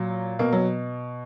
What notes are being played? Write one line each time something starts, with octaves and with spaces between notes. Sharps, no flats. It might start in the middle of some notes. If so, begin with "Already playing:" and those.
Already playing: A#2 F#3
B2 A#3
F#3